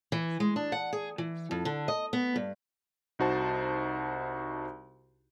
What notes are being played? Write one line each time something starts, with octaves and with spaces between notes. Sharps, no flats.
E3
G#3
D4
F#5
G#4
E3
F2
D3
D#5
B3
G2
C2 D#4 F#4 C5 A5